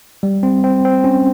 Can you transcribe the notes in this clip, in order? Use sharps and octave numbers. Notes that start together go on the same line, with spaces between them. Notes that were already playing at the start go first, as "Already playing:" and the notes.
G3
C4
C4
C4
C#4